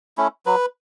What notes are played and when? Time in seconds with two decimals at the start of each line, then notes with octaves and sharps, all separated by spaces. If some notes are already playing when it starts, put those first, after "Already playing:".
0.18 A3 C#4 E4
0.46 F#3 B4